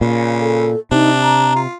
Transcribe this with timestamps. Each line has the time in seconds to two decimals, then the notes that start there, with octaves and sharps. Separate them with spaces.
0.01 A#2 C#3
0.40 A4
0.92 C3 D4 D#4
1.22 A#5
1.56 F4